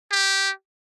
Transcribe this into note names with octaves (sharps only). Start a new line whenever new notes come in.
G4